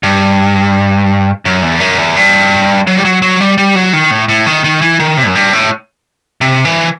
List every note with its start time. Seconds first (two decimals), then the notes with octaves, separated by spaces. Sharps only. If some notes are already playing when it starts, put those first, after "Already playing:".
0.03 G2
1.45 F#2
1.63 E2
1.80 F#2
1.98 E2
2.16 G2
2.87 F#3
2.97 G3
3.05 F#3
3.22 F#3
3.41 G3
3.58 G3
3.75 F#3
3.93 D#3
4.11 A2
4.29 A2
4.46 D#3
4.64 D#3
4.82 E3
5.00 D#3
5.17 C3
5.27 F#2
5.35 G2
5.53 A2
6.41 C3
6.65 E3